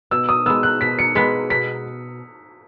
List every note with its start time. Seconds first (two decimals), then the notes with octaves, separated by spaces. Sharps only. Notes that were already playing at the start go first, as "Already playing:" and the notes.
0.11 B2 E6
0.29 D#6
0.46 G#3 B3 E6
0.63 F#6
0.81 B2 B6
0.99 C#7
1.15 G#3 B3 B6
1.50 B2 B6